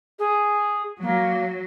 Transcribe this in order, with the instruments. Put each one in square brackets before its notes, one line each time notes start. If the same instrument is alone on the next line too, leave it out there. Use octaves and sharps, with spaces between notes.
[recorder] G#4
[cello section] F#3 [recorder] A#3